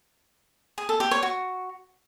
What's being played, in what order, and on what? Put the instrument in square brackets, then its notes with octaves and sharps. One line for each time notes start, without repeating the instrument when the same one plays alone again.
[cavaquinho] G#4
A4
G4
C#5
F#4